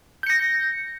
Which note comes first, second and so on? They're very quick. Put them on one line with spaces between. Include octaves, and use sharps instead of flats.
G6 C#7 A#6